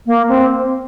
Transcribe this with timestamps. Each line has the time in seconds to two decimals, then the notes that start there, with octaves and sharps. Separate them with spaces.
0.06 A#3
0.29 C4